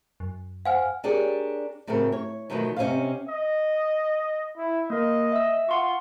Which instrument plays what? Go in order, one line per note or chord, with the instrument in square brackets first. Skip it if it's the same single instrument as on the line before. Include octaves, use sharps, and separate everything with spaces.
[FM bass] F#2
[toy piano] C5 F#5 [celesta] F5 G#5 F6
[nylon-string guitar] D4 G4 G#4 A#4 C#5 D5
A2 C#3 F#3 C4 A#4
C#5
B2 D#3 F3 F#3 A3 B3
C3 C#4 G4 C5 D#5 F5
[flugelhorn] D#5
E4
[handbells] A#3 A#4 [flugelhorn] D#5
[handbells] E5 E6
[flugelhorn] F4 [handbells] F#5 C6 C#6